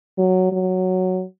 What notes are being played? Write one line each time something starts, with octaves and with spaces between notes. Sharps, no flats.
F#3
F#3